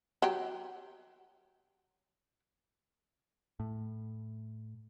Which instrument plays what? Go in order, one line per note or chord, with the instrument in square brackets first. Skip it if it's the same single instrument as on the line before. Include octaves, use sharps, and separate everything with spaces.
[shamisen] F#3 G4
[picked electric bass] A2